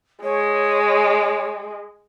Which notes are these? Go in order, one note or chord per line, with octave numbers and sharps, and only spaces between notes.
G#3 C#5